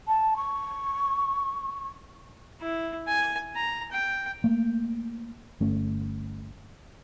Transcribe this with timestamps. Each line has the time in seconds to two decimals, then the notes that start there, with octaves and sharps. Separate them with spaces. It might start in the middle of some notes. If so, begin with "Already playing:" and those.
0.07 A5
0.36 C#6
2.61 E4
3.08 G#5
3.56 A#5
3.92 G5
4.44 A3 A#3
5.60 G1 A3 C#4